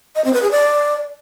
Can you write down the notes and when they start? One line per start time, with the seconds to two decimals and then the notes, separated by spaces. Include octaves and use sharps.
0.15 D#5
0.24 C4
0.33 B4
0.42 G#4
0.51 D5